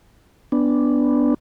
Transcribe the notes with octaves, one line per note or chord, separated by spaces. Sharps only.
B3 D4